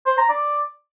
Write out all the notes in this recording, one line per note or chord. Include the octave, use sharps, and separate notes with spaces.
C5
A#5
D5